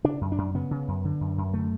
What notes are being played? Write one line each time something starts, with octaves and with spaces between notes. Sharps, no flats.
C#3 D4
F#2
D4
F#2
C#3 B3
C#3
F#2
D3
F#2
F#2
D3 A3